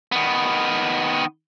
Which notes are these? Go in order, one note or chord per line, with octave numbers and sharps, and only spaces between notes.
D#3 B3